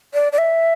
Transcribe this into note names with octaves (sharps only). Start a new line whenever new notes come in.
D5
D5
E5